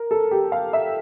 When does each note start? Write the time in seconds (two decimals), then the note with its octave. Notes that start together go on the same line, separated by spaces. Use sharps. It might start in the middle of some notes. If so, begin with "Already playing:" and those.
Already playing: A#4
0.11 A4
0.31 G4
0.52 F5
0.73 E5